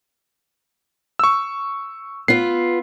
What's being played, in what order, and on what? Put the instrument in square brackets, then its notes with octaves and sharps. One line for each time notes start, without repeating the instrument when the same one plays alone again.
[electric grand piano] C#6 E6
[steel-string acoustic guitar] B3 F4 [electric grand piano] C7